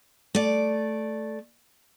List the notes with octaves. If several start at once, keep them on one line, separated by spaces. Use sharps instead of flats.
A3 D5